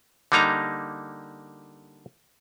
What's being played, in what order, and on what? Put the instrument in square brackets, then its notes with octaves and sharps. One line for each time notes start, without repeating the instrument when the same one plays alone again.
[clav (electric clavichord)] D3 G3 A#3 D#4 A#5